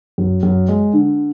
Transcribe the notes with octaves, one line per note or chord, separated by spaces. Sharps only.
F#2
F#2
G#3
D3